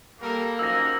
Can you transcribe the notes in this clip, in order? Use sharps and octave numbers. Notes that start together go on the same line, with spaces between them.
G3 A#3 A4 A#4
F#2 F3 D#4 E6 A#6